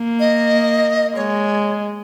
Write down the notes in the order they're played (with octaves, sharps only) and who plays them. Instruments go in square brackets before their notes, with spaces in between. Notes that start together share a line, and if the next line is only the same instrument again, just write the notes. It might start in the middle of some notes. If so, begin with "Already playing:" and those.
Already playing: [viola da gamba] A#3
[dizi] D#5
[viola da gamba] G#3 [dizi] C#5